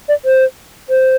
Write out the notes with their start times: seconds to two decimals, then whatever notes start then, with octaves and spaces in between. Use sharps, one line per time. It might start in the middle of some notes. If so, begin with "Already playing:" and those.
0.09 D5
0.25 C5
0.90 C5